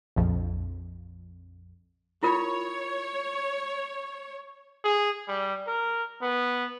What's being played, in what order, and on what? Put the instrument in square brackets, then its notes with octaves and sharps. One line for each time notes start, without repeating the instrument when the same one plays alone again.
[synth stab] A#1 F2
[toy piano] E4 F4 A#4 [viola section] C#5
[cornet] G#4
G3
A#4
B3